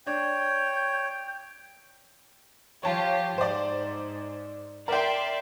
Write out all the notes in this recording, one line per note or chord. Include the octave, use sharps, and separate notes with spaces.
D4 C#5 G5 G6
F3 F4 G4 C#5 A5
G#2 C5 D5
A#4 D5 E5 G5 C6